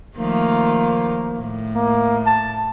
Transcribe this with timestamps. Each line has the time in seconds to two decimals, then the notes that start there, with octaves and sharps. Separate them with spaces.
0.17 D#3 F3 A3 A#3
1.38 A2
1.75 A#3
2.26 A5